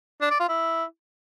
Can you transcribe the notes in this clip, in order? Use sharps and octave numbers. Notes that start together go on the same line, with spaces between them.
D4
D5
F4
E4